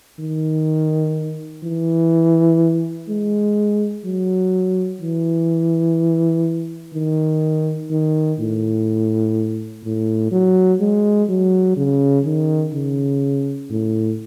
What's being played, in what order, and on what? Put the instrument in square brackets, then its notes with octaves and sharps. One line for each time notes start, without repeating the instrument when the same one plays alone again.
[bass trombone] D#3
E3
G#3
F#3
E3
D#3
D#3
A2
A2
F#3
G#3
F#3
C#3
D#3
C#3
A2